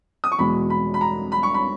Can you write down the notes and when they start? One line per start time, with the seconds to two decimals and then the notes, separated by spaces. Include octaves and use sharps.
0.24 D#6
0.32 C#6
0.39 E2 B2 G#3 B5
0.70 B5
0.94 B5
1.01 A#5
1.32 B5
1.43 C#6
1.54 B5